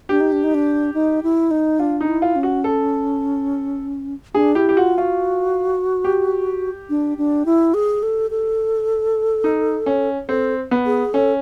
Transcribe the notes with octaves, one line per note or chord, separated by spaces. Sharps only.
D4 G4
D#4
D4
D#4
D4
D#4
E4
D#4
D4 F4
D#4
E4
F4
C#4
F#4
A4
D4 G#4
E4 G4
G4
F4 F#4
F4 F#4
G4
D4
D4
E4
G#4
A4
A4
D#4
C#4
C4 A4
B3
G#4
C#4 A4